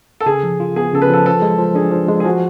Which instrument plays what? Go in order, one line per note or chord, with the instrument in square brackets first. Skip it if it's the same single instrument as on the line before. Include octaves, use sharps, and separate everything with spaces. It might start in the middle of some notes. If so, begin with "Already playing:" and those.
[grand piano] A4
[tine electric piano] C#3 [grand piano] G#4
[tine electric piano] F3
F4
[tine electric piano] B3 [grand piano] G#4
[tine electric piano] C#3 [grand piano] A4
[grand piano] B4
[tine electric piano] F3 [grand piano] A4
[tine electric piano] F3 [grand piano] A4
[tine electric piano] G#3
F3
[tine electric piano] D4 [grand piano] G#4
[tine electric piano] F3
G#3
[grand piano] G#4
[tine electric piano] F3 [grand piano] F#4